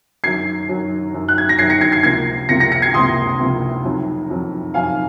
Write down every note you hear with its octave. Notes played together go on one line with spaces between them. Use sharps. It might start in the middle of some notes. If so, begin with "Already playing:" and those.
F#2 D#3 F#3 G#6 C7
F#2 D#3 F#3
F#2 D#3 F#3
F#6
G#6
A#6
F#2 D#3 F#3 G#6 C7
A#6 C#7
G#6 C7
G#6 C7
C#2 C3 F3 A#3 G#6 C7
C#2 C3 F3 A#3 A#6 C#7
A#6 C#7
A#6 C#7
G#6 C7
C#2 C3 F3 A#3 C6 D#6
C#2 C3 F3 A#3
F2 D#3 F#3
F2 D#3 F#3
F2 D#3 F#3 F5 G#5